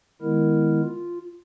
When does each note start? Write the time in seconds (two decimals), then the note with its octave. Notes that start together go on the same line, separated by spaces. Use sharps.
0.22 D#3 G#3 B3 E4 A#4
0.82 F4